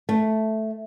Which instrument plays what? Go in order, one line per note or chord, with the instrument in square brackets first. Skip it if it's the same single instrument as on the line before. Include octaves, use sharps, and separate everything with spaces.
[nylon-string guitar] A3